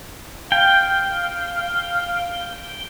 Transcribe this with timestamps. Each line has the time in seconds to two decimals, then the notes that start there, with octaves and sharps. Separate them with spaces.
0.52 F5 G5